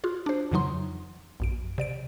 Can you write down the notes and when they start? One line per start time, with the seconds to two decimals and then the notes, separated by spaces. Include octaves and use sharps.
0.04 F4 F#4 G#4
0.26 D4 C5
0.52 F2 C#3 E3 F#3 D#4 C6
1.40 A#1 F#2 D7
1.78 C3 D5 D7